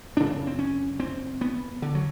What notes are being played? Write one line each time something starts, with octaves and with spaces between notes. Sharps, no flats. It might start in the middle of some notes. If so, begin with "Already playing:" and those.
F#2 C#3 D4
C4
C#4
C4
B3
D3
F#3